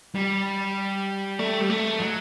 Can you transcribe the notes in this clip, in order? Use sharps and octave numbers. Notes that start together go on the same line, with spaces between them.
G3
A3
G3
A3
F#3